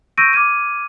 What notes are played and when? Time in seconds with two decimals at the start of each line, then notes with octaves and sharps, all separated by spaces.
0.18 C#6 E6 G6 A#6 D7 D#7
0.33 D6 F6 G#6 D#7